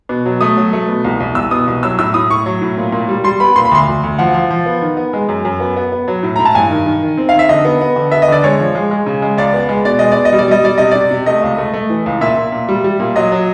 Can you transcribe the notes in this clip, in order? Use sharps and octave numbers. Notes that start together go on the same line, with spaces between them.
B2
F#3
A3 D#6
F#3
A3
B2
C2
C2
C2 E6
B2 D#6
C2
F#3 E6
A2 E6
A2 D#6
A2 C#6
F#3
A2
A#2
A#2
G3
G3 C6
B3 B5
A#2 C6
B5
D2 C6
D2
D2
F3 F#5
F3
F3
B3
D#3
B3
G#3
F#2
F#2
B3
B3
B3
F#3
A2
A2 A#5
A5
G2 G#5
D#3
D#3
D#3
C4
D#3 F5
E5
D3 D#5
B3
B3
D3
B3 E5
D#5
D3 D5
G#3 C#5
F3
G#3
G#3
C#3
G#3
C#2 D5
B3
G#3
B2 D5
G#3 D#5
B2 D5
D#5
G3
D5
G3 D#5
G3 D5
C3 D#5
C3 D5
C3
A3 D#5
C#2
A3
A3
E3
C#2
A#2 E5
A#2
A#2
G3
G3
A#2
F#3 D#5
F#3